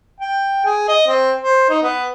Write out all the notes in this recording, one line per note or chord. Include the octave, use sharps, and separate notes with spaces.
G5
G#4
D#5
C4
C5
D#4
B3